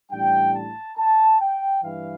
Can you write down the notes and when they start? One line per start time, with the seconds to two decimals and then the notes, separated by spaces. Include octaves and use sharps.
0.12 A1 A2 G3 D4 G5
0.55 A5
0.97 A5
1.41 G5
1.83 G2 E3 F5